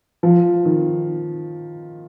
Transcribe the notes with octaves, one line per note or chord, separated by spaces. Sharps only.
F3
D#3